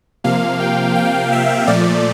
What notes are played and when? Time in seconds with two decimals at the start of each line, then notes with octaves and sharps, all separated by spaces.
0.24 C3 F3 A#3 F5
0.60 G5
0.96 G5
1.32 E5
1.67 A#2 F3 A3 D5